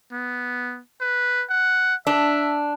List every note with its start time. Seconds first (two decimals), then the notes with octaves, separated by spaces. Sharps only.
0.12 B3
1.01 B4
1.50 F#5
2.07 D4 E5